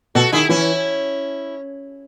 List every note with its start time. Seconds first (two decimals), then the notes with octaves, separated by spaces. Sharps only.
0.15 B2 F#4 A4
0.32 D#3 E4 G#4
0.49 E3 C#4 E4